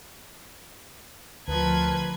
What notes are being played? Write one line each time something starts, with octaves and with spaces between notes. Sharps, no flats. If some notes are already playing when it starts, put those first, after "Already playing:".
D2 F3 A#4 B4 A5 G#6